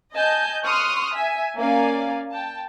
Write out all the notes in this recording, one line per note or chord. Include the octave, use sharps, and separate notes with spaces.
D#5 G#5 A5 G6
C6 C#6 D#6 F6 F#6
E5 G#5
A#3 C#4 D5 F5 G#5
G5 A5